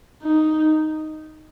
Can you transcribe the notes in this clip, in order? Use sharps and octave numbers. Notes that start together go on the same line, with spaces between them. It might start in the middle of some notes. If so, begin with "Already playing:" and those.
D#4